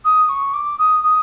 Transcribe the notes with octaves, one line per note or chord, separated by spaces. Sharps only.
D#6
C#6
D6
D#6
D#6